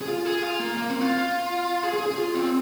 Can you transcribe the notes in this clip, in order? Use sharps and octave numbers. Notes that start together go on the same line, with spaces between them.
G#4
F4
G#4
F4
A#3
A#3
C4
F4
G#4
G#4
G#4
F4
C4